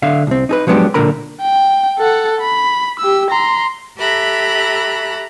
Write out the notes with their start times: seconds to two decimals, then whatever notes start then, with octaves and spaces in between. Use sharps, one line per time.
0.02 D3 E5 F5
0.27 C2 C4
0.49 D#4 G#4 B4
0.67 F3 F#3 G#3 B3 D4 G4
0.94 B1 A#2 D3 A#4 A#5 B5
1.42 G5
1.99 A4 F#5
2.41 B5
3.00 G4 E6
3.30 A#5 C6
3.97 G4 A4 E5 A#5 B5 F#6